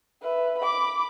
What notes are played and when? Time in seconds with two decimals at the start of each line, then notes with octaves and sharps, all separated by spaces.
0.22 B4 E5
0.59 B5 D6